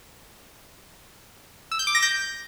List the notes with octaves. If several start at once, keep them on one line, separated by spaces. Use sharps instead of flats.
E6
G6
D6
A#6
G6